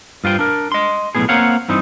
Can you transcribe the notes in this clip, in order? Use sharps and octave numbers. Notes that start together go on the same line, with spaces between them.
G2 F4 C5 G5
D4 A#4
D#5 C6
B1 F#2 A2 B3 G#4
A#3 C4 C5 C#5 F5 F#5
G2 E3 C4 D#4